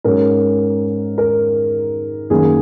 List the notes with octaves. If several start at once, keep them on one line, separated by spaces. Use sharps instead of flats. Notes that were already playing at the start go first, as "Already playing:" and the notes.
G#2 F#3 C#4 A#4
A#4
F#2 D#3 A#3 C#4 G#4